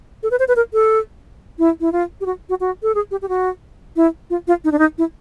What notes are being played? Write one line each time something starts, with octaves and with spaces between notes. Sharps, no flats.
A4
B4
C5
B4
A#4
A4
E4
E4
F4
G4
F#4
F#4
F#4
A4
G#4
G4
G4
F#4
E4
F4
F4
D#4
D4
D#4
E4